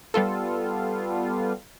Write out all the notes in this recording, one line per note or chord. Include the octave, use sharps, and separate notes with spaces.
G3 B3 F4 A4